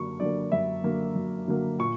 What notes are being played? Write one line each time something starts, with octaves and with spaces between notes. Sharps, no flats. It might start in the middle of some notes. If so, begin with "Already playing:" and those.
Already playing: F#2 D3 F#3 A#3 C#6
D3 F#3 A#3 D5
F#2 E5
D3 F#3 A#3
F#2
D3 F#3 A#3
A#2 C#6